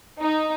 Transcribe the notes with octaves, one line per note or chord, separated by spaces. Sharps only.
D#4